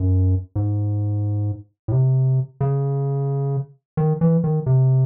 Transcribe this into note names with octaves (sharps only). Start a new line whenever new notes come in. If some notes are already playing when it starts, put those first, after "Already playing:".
Already playing: F#2
G#2
A2
C3
C#3
D#3
E3
D#3
C3